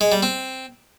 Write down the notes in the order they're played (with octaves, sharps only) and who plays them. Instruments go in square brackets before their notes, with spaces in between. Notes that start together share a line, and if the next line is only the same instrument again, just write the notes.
[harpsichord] G#3
G3
C4